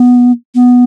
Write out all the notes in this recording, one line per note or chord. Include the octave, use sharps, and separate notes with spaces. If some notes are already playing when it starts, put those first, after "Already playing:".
Already playing: B3
B3